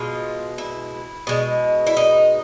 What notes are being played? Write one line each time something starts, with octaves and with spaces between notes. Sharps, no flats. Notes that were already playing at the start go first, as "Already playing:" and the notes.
Already playing: B2 G#3 F4
E4
B2 G#3
E4
D#4